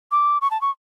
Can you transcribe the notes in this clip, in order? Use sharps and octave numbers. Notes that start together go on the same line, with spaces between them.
D6
C#6
A5
C#6